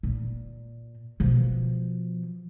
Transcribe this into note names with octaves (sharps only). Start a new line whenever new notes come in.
A#2
B2 F3